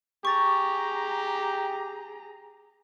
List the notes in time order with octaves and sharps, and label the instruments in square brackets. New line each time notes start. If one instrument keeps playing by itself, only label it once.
[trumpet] G4 [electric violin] G#4 A#5 [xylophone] C#6 A6